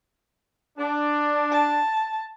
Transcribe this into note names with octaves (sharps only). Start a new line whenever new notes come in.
D4
A5